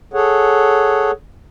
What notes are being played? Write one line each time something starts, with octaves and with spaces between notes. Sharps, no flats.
G#4 A4 C#5 F#5